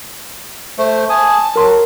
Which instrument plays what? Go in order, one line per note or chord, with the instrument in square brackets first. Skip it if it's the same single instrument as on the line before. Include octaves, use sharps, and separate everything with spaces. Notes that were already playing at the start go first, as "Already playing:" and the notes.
[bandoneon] A3 [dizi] C5
[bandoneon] G#5 D#6 [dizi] A5
[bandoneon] F#3 [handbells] A#4 C6